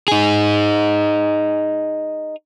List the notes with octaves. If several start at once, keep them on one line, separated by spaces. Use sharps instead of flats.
D#4 G#4